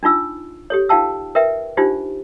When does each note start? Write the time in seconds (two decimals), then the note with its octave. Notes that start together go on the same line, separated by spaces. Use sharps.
0.03 D4 D#4 F4 E6
0.70 G4 A4 C#5
0.89 D#4 F4 F5 G5 A5 E6
1.35 A#4 B4 E5 G5
1.77 D4 D#4 F4 G4 C5